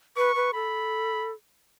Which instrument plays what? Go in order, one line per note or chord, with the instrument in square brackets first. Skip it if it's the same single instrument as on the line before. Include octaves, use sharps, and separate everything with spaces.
[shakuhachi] B4 [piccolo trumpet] C#6
[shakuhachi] B4
[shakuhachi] A4 [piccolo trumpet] B5